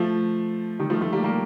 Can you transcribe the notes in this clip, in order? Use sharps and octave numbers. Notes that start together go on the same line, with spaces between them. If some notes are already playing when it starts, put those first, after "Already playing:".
Already playing: F3 A3
D#3 G3
F3 A3
F3 A3
G3 A#3
G3 A#3